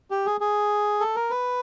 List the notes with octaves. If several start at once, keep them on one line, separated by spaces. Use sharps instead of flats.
G4
G#4
G#4
A4
A#4
B4